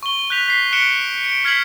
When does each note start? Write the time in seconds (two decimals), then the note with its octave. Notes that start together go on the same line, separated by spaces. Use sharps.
0.03 C#6 G7
0.30 F#6 G6 B6 F7
0.48 B6 C7
0.73 F#6 B6 C#7 D7 E7 G7
1.24 D7
1.45 F6 G#6 B6 C7 F#7